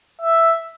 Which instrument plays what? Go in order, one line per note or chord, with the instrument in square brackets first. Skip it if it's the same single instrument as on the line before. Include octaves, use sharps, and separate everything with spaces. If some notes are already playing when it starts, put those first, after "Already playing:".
[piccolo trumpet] E5